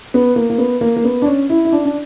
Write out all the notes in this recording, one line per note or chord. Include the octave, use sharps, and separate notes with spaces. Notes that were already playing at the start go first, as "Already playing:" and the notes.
B3
A#3
A#3
B3
A#3
A#3
B3
D4
C#4
E4
E4
D4
D4